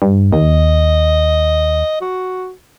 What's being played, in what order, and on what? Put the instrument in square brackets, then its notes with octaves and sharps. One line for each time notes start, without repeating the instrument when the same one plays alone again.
[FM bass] G2
[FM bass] D#2 [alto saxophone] D#5
[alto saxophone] F#4